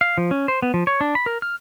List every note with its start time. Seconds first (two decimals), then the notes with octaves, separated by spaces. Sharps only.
0.01 F5
0.18 F3
0.31 C#4
0.48 C5
0.62 B3
0.74 F3
0.87 C#5
1.01 D4
1.15 B5
1.26 A#4
1.42 F6